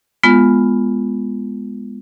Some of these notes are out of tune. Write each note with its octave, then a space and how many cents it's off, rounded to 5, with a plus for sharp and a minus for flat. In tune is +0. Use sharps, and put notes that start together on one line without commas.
G#3 +0 B3 +0 F4 +0